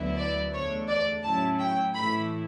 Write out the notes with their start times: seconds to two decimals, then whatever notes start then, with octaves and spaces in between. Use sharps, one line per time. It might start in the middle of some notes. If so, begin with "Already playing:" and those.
Already playing: D2 D3 F#3 B3 E4
0.18 D5
0.53 E2 D3 A3 D4 C#5
0.89 D5
1.24 A2 F#3 C#4 E4 A5
1.60 G5
1.95 A2 E3 A3 E4 B5